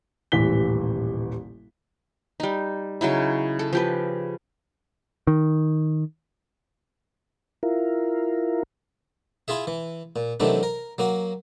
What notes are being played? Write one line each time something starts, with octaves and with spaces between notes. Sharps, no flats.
D#1 A1 C3 E3 B6 G7
G3 D#4
C#3 F#3 D#4 E4
A4
F3 G4 B4
D#3
E4 F4 A#4
E4 F4 G#4 E5
E3
A#2
C3 D#3 E3 F#3 A3 D4
A#4
F#3 A#3 F#4